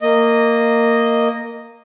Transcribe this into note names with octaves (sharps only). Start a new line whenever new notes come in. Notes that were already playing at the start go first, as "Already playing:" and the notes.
A#3 D#5